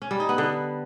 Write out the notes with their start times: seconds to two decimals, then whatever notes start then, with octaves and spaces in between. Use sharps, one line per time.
0.02 C#4
0.11 G3
0.20 D#4
0.29 B3
0.38 D3